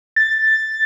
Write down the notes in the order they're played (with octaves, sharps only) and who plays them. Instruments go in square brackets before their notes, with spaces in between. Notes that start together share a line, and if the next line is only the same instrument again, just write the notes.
[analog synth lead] A6